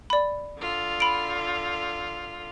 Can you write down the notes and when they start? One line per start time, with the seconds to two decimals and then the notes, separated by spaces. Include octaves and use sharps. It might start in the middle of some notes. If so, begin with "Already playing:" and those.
0.10 D5 B5
0.58 D3 F4
1.00 B5 D7